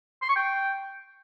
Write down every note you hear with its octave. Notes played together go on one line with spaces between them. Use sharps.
C6
C#6
G5